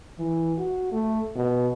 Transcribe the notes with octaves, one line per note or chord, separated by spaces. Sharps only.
E3
F#4
A3
B2